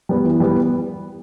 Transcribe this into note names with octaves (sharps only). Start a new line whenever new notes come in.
G3 B3
E3
G3 B3